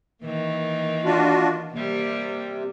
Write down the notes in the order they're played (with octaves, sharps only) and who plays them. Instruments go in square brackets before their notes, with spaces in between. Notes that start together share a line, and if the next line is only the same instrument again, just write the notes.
[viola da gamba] D#3 E3 A#3
[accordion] D4 F4 F#4
[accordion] C3 [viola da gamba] G3 A#3